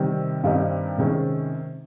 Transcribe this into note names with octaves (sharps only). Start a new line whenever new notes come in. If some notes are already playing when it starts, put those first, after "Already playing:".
Already playing: C3 D#3 G3
G2 D#3 G3 C4 D#4
C3 D#3 G#3 C#4